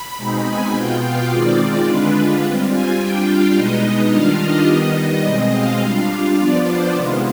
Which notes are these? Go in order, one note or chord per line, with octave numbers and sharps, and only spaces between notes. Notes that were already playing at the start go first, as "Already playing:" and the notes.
Already playing: B5
B2 G#3 C4 D#4
G#5
B2 B3 F4 G5
F5
D#3 G#3 C4 F4 D5
D3 G#3 D4 F4 B4
G3 C4 F4
G#5
G3 D4 F4 G5
F5
B2 G#3 B3 D#4 D#5
D#3 G3 D4 F4 F5
D#5
D#3 G3 B3
B2 G#3 C4 D#5
F5
G3 D4 F4
F3 B3 D4 F4 D5
C5
C3 D#3 G#3 B3 F4